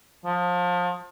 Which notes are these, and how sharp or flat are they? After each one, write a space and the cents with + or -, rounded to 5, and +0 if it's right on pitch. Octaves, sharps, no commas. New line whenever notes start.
F3 +30